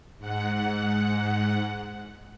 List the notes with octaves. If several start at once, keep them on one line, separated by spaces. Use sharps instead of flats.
G#2 F#5